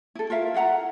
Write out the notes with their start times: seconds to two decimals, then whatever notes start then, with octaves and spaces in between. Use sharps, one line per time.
0.15 E4 A4
0.30 F4 A#4 E5 F5
0.54 E4 A4 F#5 A#5